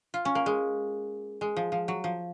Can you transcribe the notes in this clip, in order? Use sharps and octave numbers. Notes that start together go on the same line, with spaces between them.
F4
C#4
A#3
G#3
G#3
F3
F3
F#3
F3